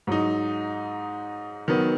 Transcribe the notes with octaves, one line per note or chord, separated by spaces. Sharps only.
G#2 F#3 D#4
D#3 F#3 B3